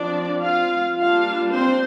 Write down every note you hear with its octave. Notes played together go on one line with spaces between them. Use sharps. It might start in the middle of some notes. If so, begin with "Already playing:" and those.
Already playing: F3 C4 D4 D5
F4 F5
G3 A#3 D4 F4 F5
C4 C5